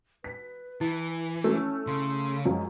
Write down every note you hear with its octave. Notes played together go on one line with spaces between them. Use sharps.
B4 B6
E3 E4
A3 C#4
C#3 C6
F#2 F3 G#3